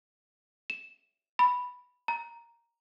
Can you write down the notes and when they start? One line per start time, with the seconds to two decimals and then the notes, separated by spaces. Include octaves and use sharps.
0.70 E7
1.39 B5
2.08 A#5